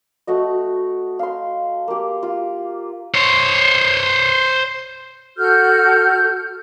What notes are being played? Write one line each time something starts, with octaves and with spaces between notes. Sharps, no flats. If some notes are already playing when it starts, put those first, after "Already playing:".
A3 F#4 D#5
F5 C6
A#3 G4
F4
C5 C#5
F#4 A4 F6 G6